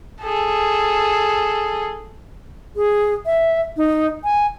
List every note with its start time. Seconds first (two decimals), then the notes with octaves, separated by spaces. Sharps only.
0.22 G#4 A4
2.76 G#4
3.26 E5
3.77 D#4
4.24 G#5